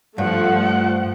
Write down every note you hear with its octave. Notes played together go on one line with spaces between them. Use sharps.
G2 F3 A3 F#5